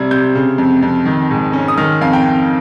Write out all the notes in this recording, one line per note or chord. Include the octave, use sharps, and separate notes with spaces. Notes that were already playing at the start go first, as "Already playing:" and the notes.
Already playing: C3 G3 G#6
C3 G6
C#3
F2
F2
D#3
G#2
C#4
D#6
D#3 F6
F2 F5
G5
F2